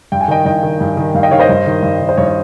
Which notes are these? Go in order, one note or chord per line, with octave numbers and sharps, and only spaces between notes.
G2 G5
G#5
D#3 D#5 G5
G2 D#5 G5
D#3
G2
D#3
G2 F5
D#5 G5
D#3 C#5 F5
C5 D#5
G2
D#3
G2
D#3
C5
G2 C#5
C#5